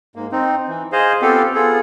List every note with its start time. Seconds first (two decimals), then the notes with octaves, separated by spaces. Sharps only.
0.16 G#2 A#3
0.32 C4 D#4
0.68 E3
0.92 G#4 C5 D#5 F5
1.22 B3 C4 F4 G4 A4 F5
1.55 B3 F4 G#4 A4